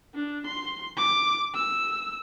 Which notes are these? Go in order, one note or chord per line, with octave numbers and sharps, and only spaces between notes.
D4
C6
D6
E6